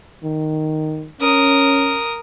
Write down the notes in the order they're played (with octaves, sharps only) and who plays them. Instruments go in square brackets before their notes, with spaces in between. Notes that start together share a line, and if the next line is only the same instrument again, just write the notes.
[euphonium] D#3
[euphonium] C#4 [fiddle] A#4 D#6